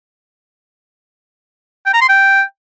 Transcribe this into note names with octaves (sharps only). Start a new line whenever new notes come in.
G5
A#5
C6
G5